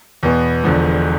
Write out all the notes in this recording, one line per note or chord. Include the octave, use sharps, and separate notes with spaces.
E2 B2 B3
E1 E2 D3 F3